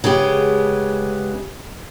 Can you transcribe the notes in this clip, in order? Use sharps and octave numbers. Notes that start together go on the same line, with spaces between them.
C#3 G#3 B3 G4